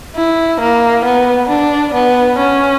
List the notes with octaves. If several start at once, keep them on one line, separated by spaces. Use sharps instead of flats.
E4
A#3
B3
D4
B3
C#4